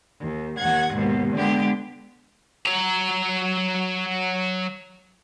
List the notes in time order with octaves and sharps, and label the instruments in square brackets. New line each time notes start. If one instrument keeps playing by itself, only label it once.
[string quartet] D#2
D#2 F#5 G#6
D#2 G#2 B2
D3 G#3 B3 G4
[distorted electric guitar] F#3 A#5